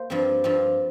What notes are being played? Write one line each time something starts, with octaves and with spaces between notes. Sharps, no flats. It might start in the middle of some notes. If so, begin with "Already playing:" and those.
Already playing: A#3 C5
G2 F3 C4
G2 F3 C4